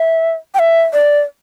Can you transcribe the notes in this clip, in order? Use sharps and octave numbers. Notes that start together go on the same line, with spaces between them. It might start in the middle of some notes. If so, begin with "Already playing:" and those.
Already playing: E5
G5
E5
D5